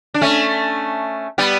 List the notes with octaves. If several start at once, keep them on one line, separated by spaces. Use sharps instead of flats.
D4
A3 C#4
G3 B3